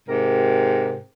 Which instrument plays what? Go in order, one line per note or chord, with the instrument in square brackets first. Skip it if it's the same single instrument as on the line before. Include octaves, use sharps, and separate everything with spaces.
[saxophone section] G#2 C3 G4 A#4